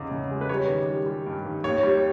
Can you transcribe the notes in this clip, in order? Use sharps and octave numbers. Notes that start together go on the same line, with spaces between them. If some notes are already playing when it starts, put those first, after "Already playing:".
Already playing: E2 C#3 D#4
C#3
G#3
B4
G3 C#5
D#3
G3
G3
G2
D#3
D#2 C#5
G3